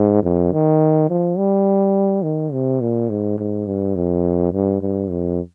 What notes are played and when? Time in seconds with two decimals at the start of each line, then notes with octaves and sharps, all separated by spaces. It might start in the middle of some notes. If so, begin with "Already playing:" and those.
Already playing: G#2
0.23 F2
0.52 D#3
1.09 F3
1.38 G3
2.24 D#3
2.53 C3
2.81 A#2
3.10 G#2
3.38 G#2
3.67 G2
3.96 F2
4.53 G2
4.81 G2
5.10 F2